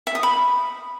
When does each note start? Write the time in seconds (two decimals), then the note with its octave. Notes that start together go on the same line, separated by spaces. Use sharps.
0.07 E5
0.15 D#6
0.23 B5